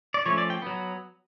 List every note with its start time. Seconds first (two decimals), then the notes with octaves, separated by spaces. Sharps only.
0.14 D5
0.26 F3 A3 C#4 C#5
0.38 D5
0.50 G5
0.62 F#3 B3